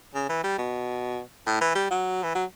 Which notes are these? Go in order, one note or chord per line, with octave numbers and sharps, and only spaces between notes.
C#3
E3
G3
B2
A2
E3
G3
F#3
E3
F#3